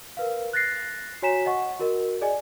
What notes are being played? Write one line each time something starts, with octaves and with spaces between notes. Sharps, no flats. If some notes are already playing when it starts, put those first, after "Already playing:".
A#4 B4 F5
F#6 A6 A#6 C7
F#4 C#5 G#5 A#5 B6 E7
D#5 F#5 C#6
F#4 A#4 D#5
G#4 D5 D#5 G#5